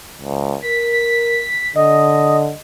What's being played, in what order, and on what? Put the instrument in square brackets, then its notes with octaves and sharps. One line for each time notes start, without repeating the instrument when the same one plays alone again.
[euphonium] C#2
[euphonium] A#4 [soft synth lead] B6
[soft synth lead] B6
[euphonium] D3 [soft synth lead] D#5